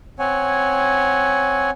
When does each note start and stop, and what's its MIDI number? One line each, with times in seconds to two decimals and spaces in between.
0.19 1.70 60
0.19 1.70 73
0.19 1.70 78
0.19 1.70 80